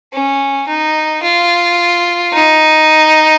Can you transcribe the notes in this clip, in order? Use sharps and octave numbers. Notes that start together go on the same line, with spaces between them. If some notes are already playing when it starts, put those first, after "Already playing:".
C#4
D#4
F4
D#4